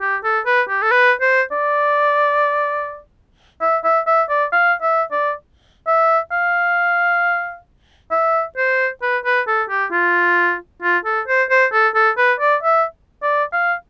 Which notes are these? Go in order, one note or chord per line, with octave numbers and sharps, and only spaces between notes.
G4
A4
B4
G4
A4
B4
C5
D5
E5
E5
E5
D5
F5
E5
D5
E5
F5
E5
C5
B4
B4
A4
G4
F4
F4
A4
C5
C5
A4
A4
B4
D5
E5
D5
F5